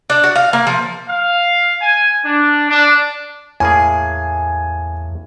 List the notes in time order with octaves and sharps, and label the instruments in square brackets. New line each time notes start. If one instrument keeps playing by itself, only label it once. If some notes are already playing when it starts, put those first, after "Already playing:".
[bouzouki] D4
F#4
F5
A#3
F3
[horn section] F5
G#5
D4
D4
[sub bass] E2 [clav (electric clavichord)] A2 A#3 G#4 [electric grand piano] G#5